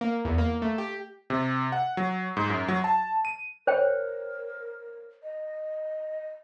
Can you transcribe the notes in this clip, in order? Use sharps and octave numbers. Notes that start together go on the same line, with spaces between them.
A#3
E2
A#3
A3
G4
C3
F#5
F#3
G#2
F#2
F#3
A5
D#7
A#4 C5 C#5 G5
D#5